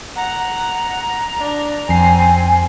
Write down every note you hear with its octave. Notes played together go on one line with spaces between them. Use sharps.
F#5 A#5
D4
F2 C4 G#5 C7